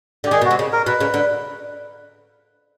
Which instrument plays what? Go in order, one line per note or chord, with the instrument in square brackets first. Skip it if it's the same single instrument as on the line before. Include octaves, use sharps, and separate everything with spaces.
[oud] D3 [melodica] G4
[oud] D#3 [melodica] G#4
[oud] B2
[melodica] F#4
[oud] C3
C#3
[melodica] A#4
[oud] B2 [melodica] B4
[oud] C#3
D3